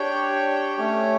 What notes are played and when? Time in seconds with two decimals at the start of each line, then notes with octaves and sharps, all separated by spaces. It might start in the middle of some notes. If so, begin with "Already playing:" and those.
Already playing: D4 G4 C#5 G5
0.77 A3 C#4 G4 C#5